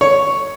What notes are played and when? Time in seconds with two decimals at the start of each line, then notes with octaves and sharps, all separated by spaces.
0.01 C#5